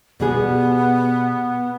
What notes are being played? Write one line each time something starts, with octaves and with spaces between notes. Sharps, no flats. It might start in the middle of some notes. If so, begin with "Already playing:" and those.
B2 G3 B3 G#4